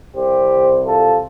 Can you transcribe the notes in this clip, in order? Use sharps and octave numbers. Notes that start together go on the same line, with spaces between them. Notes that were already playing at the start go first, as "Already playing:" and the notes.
C2 C3 G3 G4 C5
F4 A4